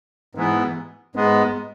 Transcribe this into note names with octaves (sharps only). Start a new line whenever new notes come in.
G#2 E3 B3
G#2 G#3 B3